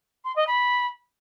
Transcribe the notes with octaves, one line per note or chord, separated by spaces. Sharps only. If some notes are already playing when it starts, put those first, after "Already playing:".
C6
D#5
B5